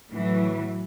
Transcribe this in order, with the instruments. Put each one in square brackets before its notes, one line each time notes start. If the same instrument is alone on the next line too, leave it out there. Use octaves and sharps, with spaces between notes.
[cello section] A2 E3 F#3